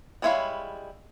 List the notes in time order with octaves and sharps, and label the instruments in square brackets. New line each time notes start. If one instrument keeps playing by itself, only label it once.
[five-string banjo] G3 G#3 E4 C#5 F5